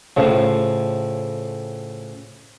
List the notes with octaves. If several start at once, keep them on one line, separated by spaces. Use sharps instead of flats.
A2 C#3 F3